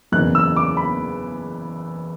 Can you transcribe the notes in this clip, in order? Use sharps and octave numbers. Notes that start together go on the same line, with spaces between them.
F#1 E2 C#3 F#6
E6
D6
B5